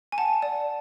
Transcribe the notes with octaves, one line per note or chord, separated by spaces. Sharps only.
G#5
F#5 A5
D5